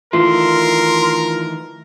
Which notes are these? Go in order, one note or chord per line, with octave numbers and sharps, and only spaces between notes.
D#3 E3 A3 F4 A#4 C6